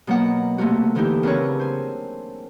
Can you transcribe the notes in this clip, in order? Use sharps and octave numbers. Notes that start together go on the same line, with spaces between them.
B2 F#3 A#3 F#5
C3 A3 A#3 F#4
D3 E3 A#3 D#4 E4 G4
C#3 C4 D4 A#4 B4 C#5
C5 G#5